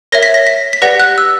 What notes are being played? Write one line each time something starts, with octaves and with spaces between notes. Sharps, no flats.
A#4 C#5 E5 A#6
B6
A#6
B6
B6
G4 B4 D5 F#5 A#6
F#6
E6